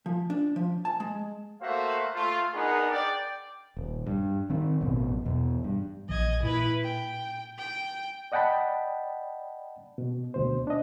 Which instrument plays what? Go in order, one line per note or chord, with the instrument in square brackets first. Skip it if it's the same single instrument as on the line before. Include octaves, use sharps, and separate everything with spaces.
[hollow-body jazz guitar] F3
D4
F3
A5
G#3
[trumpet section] A3 A#3 F#4 C5 E5 F5
A3 F4
B3 D4 D#4 G#4 A#4 F#5
D5 G5
[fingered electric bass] D#1
G2
D#3 C4
A1 F#2 B2
E2 B2
G2
[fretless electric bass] A#1 E3 [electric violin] D#5 G#6
[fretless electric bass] A#2 [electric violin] E4 B4
[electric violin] G5
G5
[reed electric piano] D5 D#5 F#5 G5 A5 B5
B2
D2 B2 C5
D4 D#5